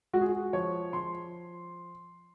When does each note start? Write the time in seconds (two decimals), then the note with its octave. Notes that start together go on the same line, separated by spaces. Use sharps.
0.13 G#3 F#4
0.21 G#4
0.29 F#4
0.53 F3 C#5
0.93 F3 C6